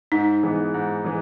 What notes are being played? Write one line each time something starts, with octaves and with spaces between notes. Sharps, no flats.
G#2 D#4
E3 G#3 B3
G#2
E3 G#3